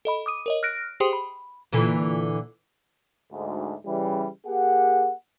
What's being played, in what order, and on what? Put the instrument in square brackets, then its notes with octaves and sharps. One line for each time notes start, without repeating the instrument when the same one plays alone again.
[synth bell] A4 D#5 B5
D6 D#6 D#7
A#4 C#5 D#5
F6 F#6 A#6 D7
G4 G#4 C5 G5 C6 D#6
B5
[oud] A#2 D3 E3
[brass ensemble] D2 G#2
C#3 E3 G3
A#3 G4 G#4 F#5